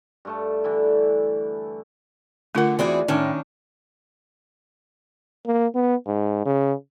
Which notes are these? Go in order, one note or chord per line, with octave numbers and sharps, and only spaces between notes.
G2 A3 A5
D3 E3 E4
D3 A3 F4 A#4 F#5
E2 E3 C4 F#4 G#4 D5
A2 D#3 C#4 D4
A#3
B3
G#2
C#3